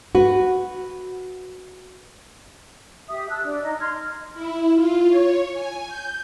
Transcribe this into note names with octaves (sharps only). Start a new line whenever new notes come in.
F#4 B4
G4 E5 D#6
A5 E6 F#6
D4
D#4 D5 D#5
C6 F6 G#6
D#5
E4
F4
C#5
G#5
G6